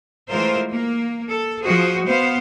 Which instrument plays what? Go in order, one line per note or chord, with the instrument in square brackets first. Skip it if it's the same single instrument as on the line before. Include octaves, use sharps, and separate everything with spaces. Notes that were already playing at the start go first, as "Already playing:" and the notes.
[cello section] E3 G#3 A3 F4 A#4 C5
A#3
A4
F3 F#4 G#4 C5
B3 C5 F5